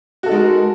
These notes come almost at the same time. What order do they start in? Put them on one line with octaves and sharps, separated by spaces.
F#4 A4 D#4 G#3 A#4